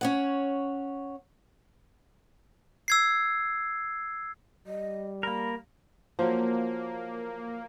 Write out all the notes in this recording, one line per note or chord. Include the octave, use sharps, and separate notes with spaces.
C#4 C#5 F#5
E6 G#6 C7
G3 D#5
A#3 A#4 B5
F3 F#3 A#3